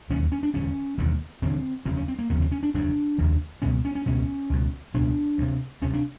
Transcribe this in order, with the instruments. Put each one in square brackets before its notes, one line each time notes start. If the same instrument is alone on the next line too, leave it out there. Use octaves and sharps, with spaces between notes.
[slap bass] E1 D#2 D3 C#4
C#4
D4
E1 D#2 D3 C#4
E1 D#2 D3
E1 D#2 D3 C4
F1 D#2 C#3 C4
C#4
C4
A#3
F1 D#2 C#3 B3
C4
C#4
D4
F1 D#2 C#3 D4
F1 D#2 C#3
C#2 B2 C#4
C#4
C#4
C#2 B2 C#4
C#2 B2
C#2 B2 D4
D2 C3
D2 C3 C#4
D4